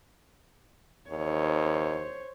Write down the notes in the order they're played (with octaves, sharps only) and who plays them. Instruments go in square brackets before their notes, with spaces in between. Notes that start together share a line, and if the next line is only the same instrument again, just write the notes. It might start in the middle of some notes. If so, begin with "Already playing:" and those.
[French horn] D#2 [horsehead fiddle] C5 C#5